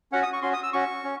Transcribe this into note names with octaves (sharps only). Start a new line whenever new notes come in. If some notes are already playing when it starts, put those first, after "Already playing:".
C#4 F#4 F#5
D#6
C#6
C#4 F#4 C6
D#6
E6
C#4 F#4 C#6
C#4